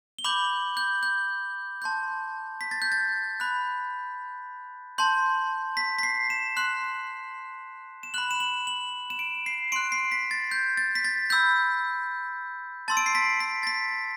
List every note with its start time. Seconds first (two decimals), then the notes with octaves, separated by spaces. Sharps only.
0.19 G7
0.24 B5 D6 G6 F#7
0.77 G6
1.03 G6
1.82 A5 C6 G6
2.61 B6
2.71 A6
2.82 G6
2.92 A6
3.40 B5 F#6
4.98 A5 C6 G6
5.77 B6
5.99 B6
6.03 C7
6.30 E7
6.57 C6 F#6
8.03 E7
8.14 B5 F#6 F#7
8.31 E7
8.40 F#7
8.67 F#7
9.10 E7
9.19 D7
9.46 C7
9.72 C6 F#6 D7
9.92 C7
10.12 B6
10.31 A6
10.51 G6
10.77 A6
10.95 B6
11.05 A6
11.30 B5 E6 G6
12.88 A5 C6 E6 A6
12.97 D7
13.06 C7
13.15 B6
13.40 B6
13.63 A6
13.67 B6